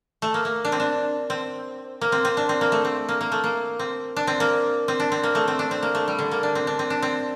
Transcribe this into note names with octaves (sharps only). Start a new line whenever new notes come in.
A3
A#3
A#3
D4
C4
D4
C4
A#3
C4
C4
D4
C4
A#3
A3
C4
A#3
A#3
A3
A#3
C4
D4
C4
A#3
C4
D4
C4
A#3
A3
C4
D4
C4
A#3
A3
G3
D3
A#3
D4
C4
D4
C4
D4
C4